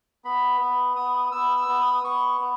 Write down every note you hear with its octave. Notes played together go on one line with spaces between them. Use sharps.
B3 B5
B3
B3 D#6
B3 E6
E6
B3
D#6
B3 C#6
B3